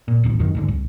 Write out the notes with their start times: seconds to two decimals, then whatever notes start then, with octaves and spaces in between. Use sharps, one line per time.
0.08 A#2
0.24 D#1 A1 D#2
0.39 G#1 F#2 D#3
0.55 D#2 G#2 D3
0.68 C2